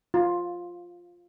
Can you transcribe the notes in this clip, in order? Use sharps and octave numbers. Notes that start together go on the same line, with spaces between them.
F4